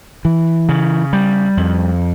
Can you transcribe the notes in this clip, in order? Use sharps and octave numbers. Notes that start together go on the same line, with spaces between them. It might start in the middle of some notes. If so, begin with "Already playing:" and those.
E3
C#3
G3
F2